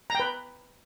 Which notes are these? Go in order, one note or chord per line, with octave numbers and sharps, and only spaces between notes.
B4 G5 A#5